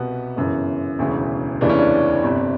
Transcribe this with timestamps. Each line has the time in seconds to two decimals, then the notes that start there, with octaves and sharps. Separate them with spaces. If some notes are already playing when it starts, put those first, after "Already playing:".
Already playing: C2 B2 B3
0.36 G1 F#2 C#3 E3
0.99 E1 D2 C#3 E3
1.61 F1 D#2 C#3 E3 D4
1.70 C#4
1.78 D4
2.23 G1 F2 C3